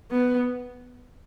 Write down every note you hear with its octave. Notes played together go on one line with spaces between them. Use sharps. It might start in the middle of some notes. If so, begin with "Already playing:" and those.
B3